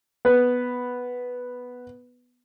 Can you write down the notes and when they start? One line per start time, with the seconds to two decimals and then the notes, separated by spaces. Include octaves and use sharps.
0.25 B3 B4